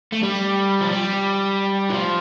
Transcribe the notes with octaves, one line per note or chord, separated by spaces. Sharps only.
A3
G3
F3
G3
E3
F3